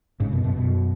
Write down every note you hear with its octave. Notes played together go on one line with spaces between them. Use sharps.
G#2 C#3
F#2 B2
F#2 B2
F#2 B2